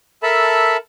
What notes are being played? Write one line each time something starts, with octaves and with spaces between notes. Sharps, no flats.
A4 A#4 E5 A5 B5